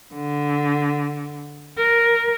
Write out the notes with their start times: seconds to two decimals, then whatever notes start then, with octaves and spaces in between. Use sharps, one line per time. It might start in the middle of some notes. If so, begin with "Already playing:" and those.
0.14 D3
1.78 A#4